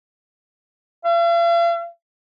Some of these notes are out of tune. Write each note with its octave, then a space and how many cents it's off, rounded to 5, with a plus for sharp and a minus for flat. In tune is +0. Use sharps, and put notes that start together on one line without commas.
F5 -45